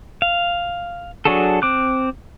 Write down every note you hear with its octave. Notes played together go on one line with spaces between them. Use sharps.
F5
F#3 D4 F#4 G#4 A4
C4 D6 F#6